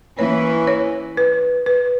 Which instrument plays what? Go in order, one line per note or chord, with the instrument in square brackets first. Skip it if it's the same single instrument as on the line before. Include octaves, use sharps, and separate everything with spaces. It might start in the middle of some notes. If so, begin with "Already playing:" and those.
[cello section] E3 A#3 C#4 E4 B4 [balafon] C#5
[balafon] C#5
B4
B4